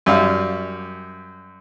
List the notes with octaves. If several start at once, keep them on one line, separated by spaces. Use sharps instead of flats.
F#2 G3 F5